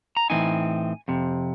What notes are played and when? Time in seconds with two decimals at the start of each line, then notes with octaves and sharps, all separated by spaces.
0.17 A#5
0.30 A2 E3 A3 C4 D#4 G#5
1.08 F2 C3